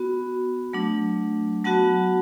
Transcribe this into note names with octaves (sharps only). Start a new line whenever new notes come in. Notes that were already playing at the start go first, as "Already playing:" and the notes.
Already playing: B3 F#4
F#3 A3 D4
F#3 B3 F#4 F#5 A5